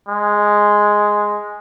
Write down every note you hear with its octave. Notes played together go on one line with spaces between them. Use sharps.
G#3